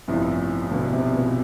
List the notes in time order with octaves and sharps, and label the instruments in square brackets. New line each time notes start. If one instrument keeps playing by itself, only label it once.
[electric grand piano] A1 G2 F3 B3 [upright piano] C3 E3
[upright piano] B2 D3
C3
B2